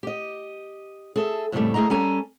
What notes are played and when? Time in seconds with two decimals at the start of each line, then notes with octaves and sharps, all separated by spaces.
0.03 G4 D#5
1.16 G#4 A4 E5
1.52 F2 A2 C#3 F3 G3 A3
1.74 D2 A3 G#4 D#5 A#5
1.90 G3 C#4 A4 G#5 A#5